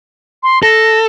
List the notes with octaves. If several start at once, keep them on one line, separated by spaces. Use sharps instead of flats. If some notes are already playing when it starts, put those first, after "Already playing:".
C6
A4 A#6